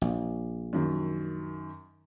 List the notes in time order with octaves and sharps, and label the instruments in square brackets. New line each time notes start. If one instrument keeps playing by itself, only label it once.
[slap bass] A#1
[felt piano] F#2 D#3